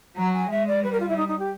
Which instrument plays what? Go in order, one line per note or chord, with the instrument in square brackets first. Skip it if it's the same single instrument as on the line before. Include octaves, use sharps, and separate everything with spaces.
[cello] F#3 [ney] A#5
[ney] G#5
[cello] G#3 [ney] E5
[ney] D5
[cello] G3 [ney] B4
[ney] A#4
F4
E4
D#4
D#4
G4